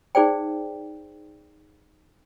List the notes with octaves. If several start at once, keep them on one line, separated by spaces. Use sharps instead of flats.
D#4 G#4 C5 D5 G5